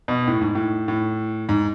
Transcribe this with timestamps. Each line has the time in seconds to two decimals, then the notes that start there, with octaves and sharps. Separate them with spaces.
0.08 B2
0.27 A2
0.41 G#2
0.55 A2
0.88 A2
1.49 G#2